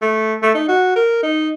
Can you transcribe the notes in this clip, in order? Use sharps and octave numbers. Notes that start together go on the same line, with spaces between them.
A3
A3
D#4
F#4
A#4
D#4